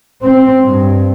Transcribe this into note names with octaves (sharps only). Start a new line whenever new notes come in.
C4
G2